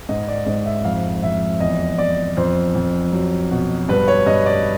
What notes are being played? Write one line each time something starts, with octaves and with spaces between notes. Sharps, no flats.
G#2 D#5
D5
G#2 D#5
E5
F2 F5
F2 E5
E2 D#5
E2 D5
F2 C5
F2
F#3
B2
G2 B4
C#5
G2 D#5
D5